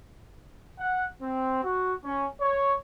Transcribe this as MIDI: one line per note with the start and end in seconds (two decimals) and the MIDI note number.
0.78 1.04 78
1.20 1.58 60
1.62 1.93 66
2.03 2.25 61
2.39 2.74 73